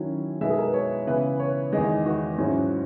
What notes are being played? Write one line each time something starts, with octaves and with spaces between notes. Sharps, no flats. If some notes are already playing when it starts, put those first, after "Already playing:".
Already playing: D#3 F#3 C#4 E4
B2 G#3 B3 E5
G#4
A#4
B4
C#5
C#3 E3 B3 E4 B4
C#5
E2 D#3 G#3 D#5
F#4
G#2 F#3 C#4 E4